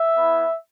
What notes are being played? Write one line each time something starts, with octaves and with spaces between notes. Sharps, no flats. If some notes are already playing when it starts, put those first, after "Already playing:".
Already playing: E5
B3 E4